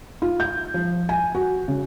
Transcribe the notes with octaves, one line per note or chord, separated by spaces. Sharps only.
F4
G6
F3
G#5
F#4
C#3